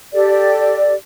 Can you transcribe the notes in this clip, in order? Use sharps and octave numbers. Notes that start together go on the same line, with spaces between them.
G4 A4 D5